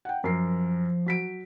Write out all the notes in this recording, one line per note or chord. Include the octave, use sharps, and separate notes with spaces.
F#5 G5
F#2 F3 A#4 C7
F#3 B6 D7